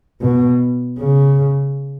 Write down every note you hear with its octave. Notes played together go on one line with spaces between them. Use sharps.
B2
C#3